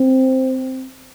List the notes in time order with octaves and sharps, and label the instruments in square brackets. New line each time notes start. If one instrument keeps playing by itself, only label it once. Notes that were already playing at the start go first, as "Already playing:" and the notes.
Already playing: [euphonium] C4